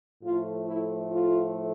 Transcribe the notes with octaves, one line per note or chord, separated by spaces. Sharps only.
A2 F3 A3 F4
E4
F4